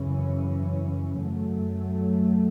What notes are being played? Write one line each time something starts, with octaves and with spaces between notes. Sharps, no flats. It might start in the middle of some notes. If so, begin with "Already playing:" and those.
Already playing: F#2 C#3 E3 C#4
F#2 F#3 A3